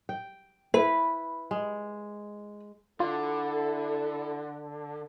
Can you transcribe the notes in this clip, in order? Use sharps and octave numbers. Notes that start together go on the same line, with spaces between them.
G5
E4 B4
G#3
D3 E4 F4 A4